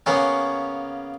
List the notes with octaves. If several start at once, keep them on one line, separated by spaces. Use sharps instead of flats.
C#3 A#3 B3 C#4